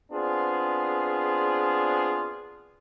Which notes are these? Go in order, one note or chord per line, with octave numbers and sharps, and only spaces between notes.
B3 C4 D4 F4 G#4